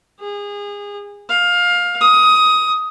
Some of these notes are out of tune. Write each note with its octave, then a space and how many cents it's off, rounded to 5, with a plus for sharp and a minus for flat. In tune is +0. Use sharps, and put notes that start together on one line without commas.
G#4 -25
F5 +20
D#6 +15